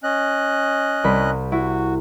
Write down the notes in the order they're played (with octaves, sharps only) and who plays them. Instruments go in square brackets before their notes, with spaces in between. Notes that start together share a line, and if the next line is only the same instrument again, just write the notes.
[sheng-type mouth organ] C#4 D#5 F#6
[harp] C2 B5 B6
[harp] E4 [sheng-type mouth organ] F#4